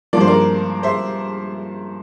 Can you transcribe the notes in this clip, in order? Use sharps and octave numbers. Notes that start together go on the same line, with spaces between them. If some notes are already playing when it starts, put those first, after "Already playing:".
G2 F3 A#3 D5
C5
A#4 D5
C5 E5